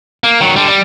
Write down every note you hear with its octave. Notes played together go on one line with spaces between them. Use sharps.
A#3
D#3 F#3
D3 G3
G3